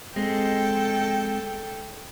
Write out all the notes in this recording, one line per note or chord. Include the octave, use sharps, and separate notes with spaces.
G#3 C4 A4 G5